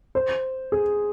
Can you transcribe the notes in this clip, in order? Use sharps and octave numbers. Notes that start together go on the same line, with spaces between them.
C5
G#4